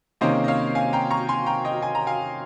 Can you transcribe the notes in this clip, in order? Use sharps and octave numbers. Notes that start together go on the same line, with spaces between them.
C3 D#3 A#3 C#4 C5 D#5
D#5
C#5 F5
F5 G#5
G5 A#5
A#5 C#6
G#5 C6
G5 A#5
D#5 G5
G#5
A#5
F5 G#5